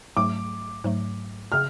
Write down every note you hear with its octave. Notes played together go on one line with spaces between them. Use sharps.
G#2 F#3 A3 D6
G#2 F#3 A3
C#3 F6